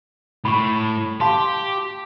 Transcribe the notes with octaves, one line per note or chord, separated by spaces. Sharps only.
A2 B5 C#6
G4 F5 A5 C6